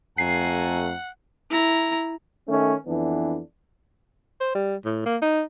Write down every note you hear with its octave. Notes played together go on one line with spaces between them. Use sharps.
F2 A3 F#5 G#5 A#5 C7
E4 A#5
D#3 A3 C#4
F2 E3 B3 D4
C5
G3
A2
A#3
D#4